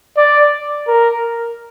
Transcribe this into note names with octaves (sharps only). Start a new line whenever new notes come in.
D5
A#4